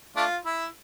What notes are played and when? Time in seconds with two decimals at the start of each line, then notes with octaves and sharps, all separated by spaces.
0.16 A3 D4 F4
0.45 E4